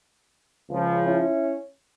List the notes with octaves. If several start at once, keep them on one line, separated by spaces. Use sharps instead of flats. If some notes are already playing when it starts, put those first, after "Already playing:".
C#2 C#3 F3
C#4 E4